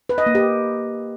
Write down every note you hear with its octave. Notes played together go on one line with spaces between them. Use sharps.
B4
D#5
A#3
G4